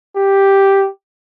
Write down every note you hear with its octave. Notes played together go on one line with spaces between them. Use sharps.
G4